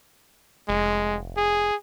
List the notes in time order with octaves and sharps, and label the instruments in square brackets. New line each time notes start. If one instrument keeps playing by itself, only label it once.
[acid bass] F1 [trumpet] G#3
[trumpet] G#4